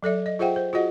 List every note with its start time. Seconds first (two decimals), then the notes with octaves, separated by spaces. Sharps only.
0.03 F#3 A4 D5 E5
0.26 D#5
0.39 F4 G#4 C5 E5 F#5 G5
0.56 C5
0.73 F4 F#4 G#4 D#5 F#5